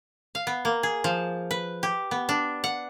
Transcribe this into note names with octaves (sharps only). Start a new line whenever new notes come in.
F5
B3
A#3
G#4
F3
B4
G4
B3
D4
F#5